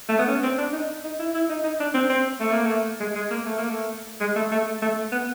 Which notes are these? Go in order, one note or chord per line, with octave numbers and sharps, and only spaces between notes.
A3
B3
C#4
C4
D4
D#4
D#4
E4
E4
D#4
D#4
D4
C4
C4
A3
A#3
A3
G#3
G#3
A#3
A3
A#3
A3
G#3
A3
A3
A3
B3